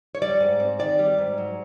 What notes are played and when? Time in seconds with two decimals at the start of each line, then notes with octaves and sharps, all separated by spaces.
0.15 C#5
0.22 G3 D5
0.40 G#2
0.60 C4
0.79 D#3 D5
0.99 G3
1.18 G#2
1.38 F#3